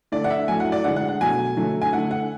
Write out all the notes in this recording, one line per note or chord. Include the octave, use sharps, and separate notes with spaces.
D3 A3 D5
F#5
E5
A2 F#3 A3 G#5
F#5
D5
D3 G#3 F#5
F#5
F#5
B2 F#3 A3 G#5
D3 F#3 A3
G#5
D3 A3 F#5
F#5